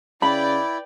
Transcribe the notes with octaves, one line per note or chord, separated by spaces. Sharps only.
C#3 E4 B4 D5 G5 B5